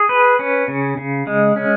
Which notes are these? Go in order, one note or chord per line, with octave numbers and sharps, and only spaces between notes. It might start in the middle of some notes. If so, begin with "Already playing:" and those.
Already playing: G#4
B4
C#4
C#3
C#3
G#3
C#4